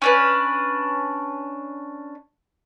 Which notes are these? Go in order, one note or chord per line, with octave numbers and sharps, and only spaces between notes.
C#4 D4 B4